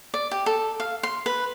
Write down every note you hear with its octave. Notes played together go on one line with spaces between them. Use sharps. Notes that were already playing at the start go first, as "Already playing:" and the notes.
D5
G4
A4
F5
C6
B4